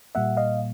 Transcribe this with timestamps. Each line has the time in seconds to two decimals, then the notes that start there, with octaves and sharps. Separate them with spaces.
0.15 A#2 G3 A#3 E5 F#5
0.37 D#5 F5